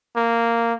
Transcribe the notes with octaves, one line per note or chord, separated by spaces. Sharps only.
A#3